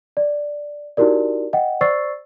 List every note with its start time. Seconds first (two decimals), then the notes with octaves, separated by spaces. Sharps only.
0.17 D5
0.97 D#4 E4 F#4 G4 A#4 D5
1.53 D#5 F#5 G5
1.81 C5 D5 C#6 E6 A6 C7